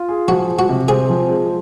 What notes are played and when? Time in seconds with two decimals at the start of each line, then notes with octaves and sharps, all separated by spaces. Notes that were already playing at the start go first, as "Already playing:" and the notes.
Already playing: F4
0.09 G#4
0.28 F3 F#4
0.48 G#3
0.59 F#4
0.69 C3
0.88 C4 G#4
1.10 F3
1.29 G#3